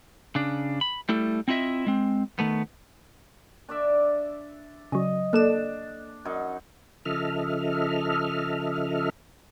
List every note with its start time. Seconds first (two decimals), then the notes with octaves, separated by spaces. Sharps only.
0.35 C#3 D4
0.81 B5
1.09 G3 A3 E4 A4
1.48 C4 E4 F4 D#5 E5
1.87 G#3 C4
2.39 D#3 A3 B3
3.69 D4 D5 E5
4.92 C#3 F#3 D#5
5.33 A#3 D4 A4 E7
6.25 F#2 D#4
7.05 C#3 F3 A4 D#5 E5 F6